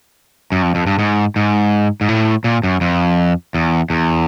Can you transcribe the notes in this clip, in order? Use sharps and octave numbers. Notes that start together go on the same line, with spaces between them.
F#2
F2
F2
G2
G#2
G#2
G#2
A2
A#2
F#2
F2
E2
E2